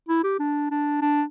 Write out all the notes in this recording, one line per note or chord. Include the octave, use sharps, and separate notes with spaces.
E4
G4
D4
D4
D4